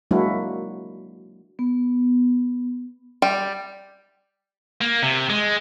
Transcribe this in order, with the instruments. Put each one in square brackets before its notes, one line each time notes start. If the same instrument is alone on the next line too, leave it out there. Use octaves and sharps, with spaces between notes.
[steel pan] F#3 G#3 A#3 D4 E4 F#4
[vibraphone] B3
[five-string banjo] G3
[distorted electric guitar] A#3
C3
G#3